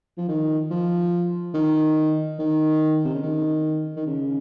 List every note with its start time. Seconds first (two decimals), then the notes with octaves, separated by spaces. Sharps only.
0.17 F3
0.29 D#3
0.70 F3
1.54 D#3
2.39 D#3
3.05 C3
3.14 C#3
3.23 D#3
3.96 D#3
4.07 C#3